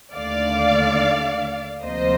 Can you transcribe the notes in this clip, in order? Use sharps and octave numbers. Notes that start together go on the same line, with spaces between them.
D#2 D3 A3 D5 F5
D2 C3 F3 A#3 C5 D#5